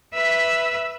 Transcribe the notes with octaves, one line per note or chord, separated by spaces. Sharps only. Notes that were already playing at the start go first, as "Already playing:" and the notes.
B4 E5